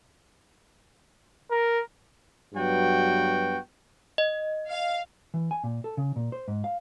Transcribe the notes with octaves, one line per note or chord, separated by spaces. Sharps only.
A#4
G2 F#3 B3 F#4 G5
D#5
F5
E3
G#5
A#2
A4
C#3
A#2
C5
G#2
F5